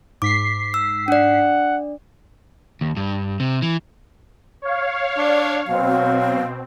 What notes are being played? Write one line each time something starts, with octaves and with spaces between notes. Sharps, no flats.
G#2 D6 B6 C7
E6
D4 D5 F#5
D#2
G2
C3
E3
C#5 F5
D4 D5
B2 F#3 C4 F5